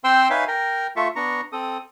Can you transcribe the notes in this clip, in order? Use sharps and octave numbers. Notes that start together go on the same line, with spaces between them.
C4 C5 G5 C6 E6
D#4 B4 C#5 E5 F5 G#5
A#4 G5 A#5
A3 F4 A4 E5 C#6
B3 D4 A#5 C#6
C4 A4 D#6